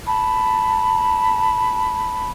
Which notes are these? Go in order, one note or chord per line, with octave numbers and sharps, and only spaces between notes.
A5 B5